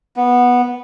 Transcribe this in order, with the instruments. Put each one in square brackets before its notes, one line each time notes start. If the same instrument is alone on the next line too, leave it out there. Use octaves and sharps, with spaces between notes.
[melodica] B3